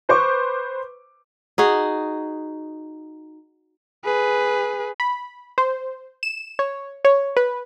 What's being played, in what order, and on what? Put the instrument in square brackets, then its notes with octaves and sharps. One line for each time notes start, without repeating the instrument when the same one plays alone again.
[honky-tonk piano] B4 C5 C#6 D6
[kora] D#4 F#4 G#4
[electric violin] G#4 B4
[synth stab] B5
C5
E7
C#5
C#5
B4